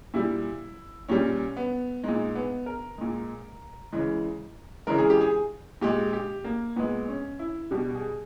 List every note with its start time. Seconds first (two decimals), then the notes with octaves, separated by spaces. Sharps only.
0.14 A#2 G3 E4
1.08 A#2 G3 C#4
1.57 B3
2.03 A#2 G#3 D#4
2.35 B3
2.66 A#4
2.98 A#2 G#3
3.93 C#3 E3 G#3
4.87 C#3 E3 G#3 A#4
4.98 G#4
5.10 G4
5.21 G#4
5.81 A#2 G#3 G4
6.13 G4
6.44 A#3
6.76 A#2 G#3 B3
7.08 C#4
7.39 E4
7.71 B2 G3 G4
7.95 G#4